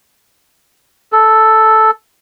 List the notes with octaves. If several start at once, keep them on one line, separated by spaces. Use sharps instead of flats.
A4